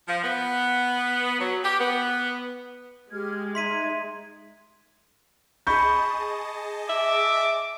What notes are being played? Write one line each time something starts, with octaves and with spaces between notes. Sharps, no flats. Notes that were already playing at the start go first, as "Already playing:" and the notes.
F3
B3
F#3
G4
B3
G#3 G4 F6 G#6
D#4 E5 C6 G#6 B6 D#7
G#4 D#5 A5 B5 C#6 G6
E5 D6